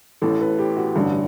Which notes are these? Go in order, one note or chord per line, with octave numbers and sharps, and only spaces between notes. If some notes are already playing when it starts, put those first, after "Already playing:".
A1 A2 E3 A4
B4
G4
F#4
A1 G2 D3